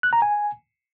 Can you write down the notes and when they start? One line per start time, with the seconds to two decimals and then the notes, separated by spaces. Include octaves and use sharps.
0.03 F#6
0.13 A#5
0.22 G#5